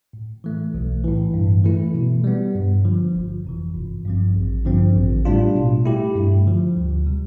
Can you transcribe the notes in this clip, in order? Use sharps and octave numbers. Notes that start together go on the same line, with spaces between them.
A2
E3 A3
B1
A2 E3
G2
E3 A3 E4
B2
G3 B3
G2
D3 F3
G1
F2 C3 E3
G1
G2 F3 C4
A1
G2 D3 F3 C4
A1
A2 G3 D4 F4
B2
A3 E4 G4
G2
D3 F3
D2
C3 G3